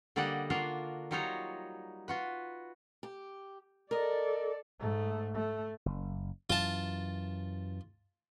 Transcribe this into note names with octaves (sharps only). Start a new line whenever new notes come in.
D3 G3 A#3 D5 D#5 F#5
A#3 D4 F4 F#4 F5
F#3 G3 D#4 F4 C#5 A#5
F4 F#4 B4
G4
A4 A#4 D5 D#5
G#2 A3
A3
F#1
F#2 E3 F4 A5